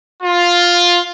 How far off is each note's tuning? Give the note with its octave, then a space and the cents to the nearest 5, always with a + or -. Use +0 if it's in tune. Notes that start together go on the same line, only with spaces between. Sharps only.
F4 +5